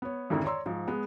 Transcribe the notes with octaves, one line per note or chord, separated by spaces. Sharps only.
B3 C#5
F2 G#2 D3 D#3 G#3 E4
C#5 D5 A#5 C6 E6
G#2 F3
G#3 B3